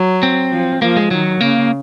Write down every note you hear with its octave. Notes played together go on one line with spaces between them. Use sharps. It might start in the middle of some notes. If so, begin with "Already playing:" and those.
Already playing: F#3
C4
F3
F3 A#3
G#3
D#3 F#3
C#3 A#3